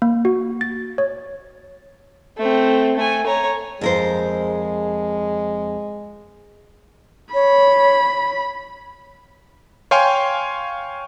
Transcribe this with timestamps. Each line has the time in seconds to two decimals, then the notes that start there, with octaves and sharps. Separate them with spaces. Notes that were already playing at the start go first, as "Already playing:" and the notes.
0.02 A#3
0.25 F#4
0.61 A6
0.98 C#5
2.37 A3 C4
2.97 A3 G#5
3.26 C#5 A#5
3.81 F2 G#3 A#4 C5
7.34 C#5 B5
9.91 C#5 F5 G5 G#5 C6 C#6